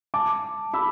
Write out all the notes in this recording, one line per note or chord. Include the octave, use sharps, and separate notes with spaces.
A5 D6
B5 E6